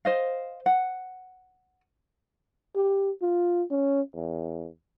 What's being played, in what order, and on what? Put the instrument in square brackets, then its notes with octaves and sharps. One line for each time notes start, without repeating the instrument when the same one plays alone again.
[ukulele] C5 D#5 F5
F#5
[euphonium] G4
F4
C#4
E2